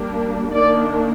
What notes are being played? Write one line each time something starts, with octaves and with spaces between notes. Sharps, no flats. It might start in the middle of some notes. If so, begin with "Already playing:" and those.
Already playing: G3 A#3 D4
D#3 A#3 D4 D5